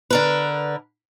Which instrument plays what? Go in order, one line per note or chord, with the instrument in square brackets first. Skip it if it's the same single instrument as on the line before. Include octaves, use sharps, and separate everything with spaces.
[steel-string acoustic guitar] D3 A#4 B4